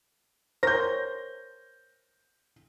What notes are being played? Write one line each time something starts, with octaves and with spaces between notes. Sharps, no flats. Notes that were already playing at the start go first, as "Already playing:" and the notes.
A#4 C5 C#5 G6 A#6